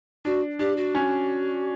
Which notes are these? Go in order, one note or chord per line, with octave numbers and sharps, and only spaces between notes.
D4 F#4
D4 G4
F#4
C#4